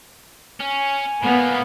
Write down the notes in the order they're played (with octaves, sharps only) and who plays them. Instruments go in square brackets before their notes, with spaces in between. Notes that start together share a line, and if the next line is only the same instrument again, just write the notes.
[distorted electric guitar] C#4 [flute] G#5
[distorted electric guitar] A2 A#3 [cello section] B3